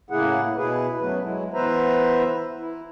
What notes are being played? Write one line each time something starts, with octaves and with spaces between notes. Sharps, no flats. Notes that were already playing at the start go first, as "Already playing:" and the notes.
A2 C#3 A#3 E4 G#4 F#5
B2 E4 G#4 B4
F#2 F#3 A3 B3 B4
F#3 G#3 E4
E3 B3 B4 C5 E5 A#5
E4